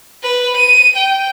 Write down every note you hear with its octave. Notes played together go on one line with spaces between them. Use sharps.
B4
D#7
G5